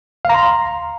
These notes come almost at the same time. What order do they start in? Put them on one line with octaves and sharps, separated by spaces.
F5 A#5 C6